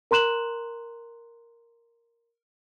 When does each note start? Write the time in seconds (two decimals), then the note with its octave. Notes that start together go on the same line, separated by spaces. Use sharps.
0.11 A#4 A#5 C6 F#6 E7 F#7